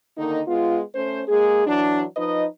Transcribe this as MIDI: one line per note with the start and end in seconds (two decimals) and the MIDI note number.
0.17 0.41 50
0.17 0.41 51
0.17 0.41 58
0.17 0.41 63
0.47 0.80 56
0.47 0.80 59
0.47 0.80 65
0.94 1.22 57
0.94 1.22 61
0.94 1.22 72
1.28 1.63 56
1.28 1.63 58
1.28 1.63 68
1.66 2.03 52
1.66 2.03 54
1.66 2.03 62
2.16 2.45 53
2.16 2.45 63
2.16 2.45 71
2.16 2.45 75